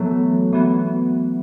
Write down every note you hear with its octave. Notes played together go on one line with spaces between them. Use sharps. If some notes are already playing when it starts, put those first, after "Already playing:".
Already playing: E3 F#3 A3 B3 F#4
E3 B3 F#4